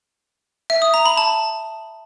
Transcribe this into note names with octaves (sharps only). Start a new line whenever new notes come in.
E5
D#6
A#5
B5
A5